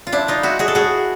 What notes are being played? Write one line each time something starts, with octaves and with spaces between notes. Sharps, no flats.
F4
D4 E4
D#4 F4
E4 F#4
F#4 G#4
A4
F#4 G#4